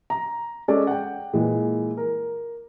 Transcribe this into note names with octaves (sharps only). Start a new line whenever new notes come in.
A#5
G#3 C#4 A4 D5
F#5 G5
A#2 E3 G#3
A#4